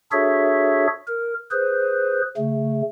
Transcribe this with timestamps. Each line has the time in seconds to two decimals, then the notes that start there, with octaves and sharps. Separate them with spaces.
0.12 D4 F#4 G#4 A4 C#5 E5
1.07 A#4
1.51 G#4 B4 C5
2.37 C#3 A3